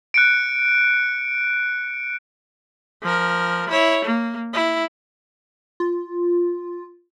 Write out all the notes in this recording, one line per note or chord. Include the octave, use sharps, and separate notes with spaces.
F#6 C#7 D7
F3 A#4
E4 C#5
A#3
E4
F4